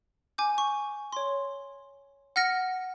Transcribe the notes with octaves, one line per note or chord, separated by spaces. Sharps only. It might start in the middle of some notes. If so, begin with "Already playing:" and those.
G#5 D6 G6
C#6
C#5 C6
F#5 F6 A#6 C#7